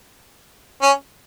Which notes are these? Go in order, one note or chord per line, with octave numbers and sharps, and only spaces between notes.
C#4